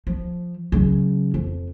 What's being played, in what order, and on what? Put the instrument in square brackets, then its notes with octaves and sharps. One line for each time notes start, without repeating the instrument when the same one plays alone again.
[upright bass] F3
C#3 F#3
F2